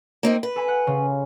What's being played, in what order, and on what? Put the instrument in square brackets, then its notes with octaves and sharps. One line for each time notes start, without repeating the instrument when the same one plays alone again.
[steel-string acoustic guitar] A#3 C4 D#4
B4
[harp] A4 G#5 B5
F#5 F#6
C#3 F4